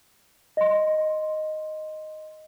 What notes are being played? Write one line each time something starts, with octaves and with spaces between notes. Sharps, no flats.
D#5 C6